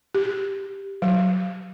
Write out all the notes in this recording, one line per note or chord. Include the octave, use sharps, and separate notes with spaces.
G4
F#3